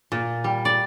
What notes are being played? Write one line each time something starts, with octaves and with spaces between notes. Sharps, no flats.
A#2
G3
D5